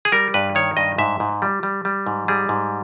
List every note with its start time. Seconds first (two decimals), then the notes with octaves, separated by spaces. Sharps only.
0.05 G#4
0.12 G3 A#4
0.34 G2 B4
0.55 D#3 C#5
0.77 G2 D#5
0.98 G#2 E5
1.20 G#2
1.42 G3
1.63 G3
1.85 G3
2.07 G#2
2.28 G3 G#4
2.49 G#2